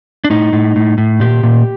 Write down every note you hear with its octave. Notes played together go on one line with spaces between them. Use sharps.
D4
A2 D#4
A2
A2
A2
A#2 G4
A#2